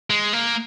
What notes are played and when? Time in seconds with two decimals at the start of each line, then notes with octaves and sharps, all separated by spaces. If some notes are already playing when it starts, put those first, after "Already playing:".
0.10 G#3
0.33 A#3